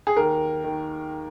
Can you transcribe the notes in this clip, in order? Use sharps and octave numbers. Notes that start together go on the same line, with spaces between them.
G#4
D#2 A#4
D#3